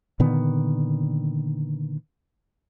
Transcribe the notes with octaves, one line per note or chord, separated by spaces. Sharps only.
A#2 D3 D#3 B3